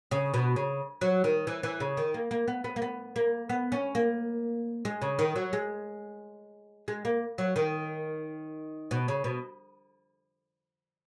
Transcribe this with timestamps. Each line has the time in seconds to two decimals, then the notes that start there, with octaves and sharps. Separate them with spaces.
0.11 C#3
0.34 B2
0.56 C#3
1.01 F#3
1.24 D#3
1.47 E3
1.63 E3
1.80 C#3
1.97 D#3
2.14 A#3
2.31 A#3
2.48 B3
2.64 B3
2.76 A#3
2.82 B3
3.16 A#3
3.49 B3
3.72 C#4
3.95 A#3
4.85 G#3
5.02 C#3
5.19 D#3
5.36 F#3
5.53 G#3
6.88 G#3
7.05 A#3
7.38 F#3
7.56 D#3
8.91 B2
9.08 C#3
9.24 B2